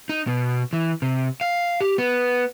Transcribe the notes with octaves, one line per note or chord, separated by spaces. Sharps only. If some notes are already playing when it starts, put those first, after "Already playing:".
D#4
B2
E3
C3
F5
G4
B3